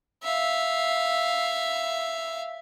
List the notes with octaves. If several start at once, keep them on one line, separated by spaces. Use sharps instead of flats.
E5 F5